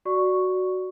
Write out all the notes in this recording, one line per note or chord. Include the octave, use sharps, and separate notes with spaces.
F#4 D5 C#6